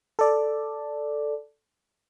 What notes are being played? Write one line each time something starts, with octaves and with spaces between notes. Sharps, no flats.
A4 D5